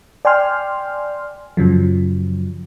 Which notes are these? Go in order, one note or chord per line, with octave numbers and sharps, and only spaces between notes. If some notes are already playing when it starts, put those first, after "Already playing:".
D5 G5 G#5 C6 F6
F#2 C#3 F3 F#3